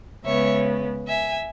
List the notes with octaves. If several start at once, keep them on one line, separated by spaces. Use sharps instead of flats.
C#3 G#3 B3 C#5 E5
E5 G#5